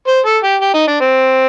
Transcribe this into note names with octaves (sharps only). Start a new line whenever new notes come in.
C5
A4
G4
G4
D#4
D4
C4